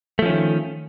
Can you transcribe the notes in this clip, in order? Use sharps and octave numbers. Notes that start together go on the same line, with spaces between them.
D#3 F3 A3 C#4